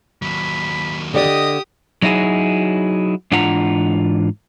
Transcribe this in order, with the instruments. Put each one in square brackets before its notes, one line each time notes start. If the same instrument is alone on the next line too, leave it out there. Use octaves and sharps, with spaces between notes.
[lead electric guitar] D#2 F#3 [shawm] B5
[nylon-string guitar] D3 D5 [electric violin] G4 D#6 [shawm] D#5
[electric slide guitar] F#3 D#4 E4 F#4 G#4
G#2 E3 D4 F4 F#5 A#5